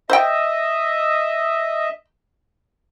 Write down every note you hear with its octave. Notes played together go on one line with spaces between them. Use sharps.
C5 D#5 E5 G5